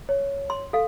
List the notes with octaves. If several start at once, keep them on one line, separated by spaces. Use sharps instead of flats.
C#5
C6
A4 F5